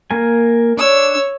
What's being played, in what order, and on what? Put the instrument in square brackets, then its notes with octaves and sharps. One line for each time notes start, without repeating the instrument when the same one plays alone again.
[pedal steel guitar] A#3 A#4 G#5
[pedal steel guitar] D4 [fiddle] C#5 E6